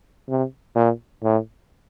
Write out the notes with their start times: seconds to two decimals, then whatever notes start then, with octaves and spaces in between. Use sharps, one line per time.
0.29 C3
0.75 A#2
1.23 A2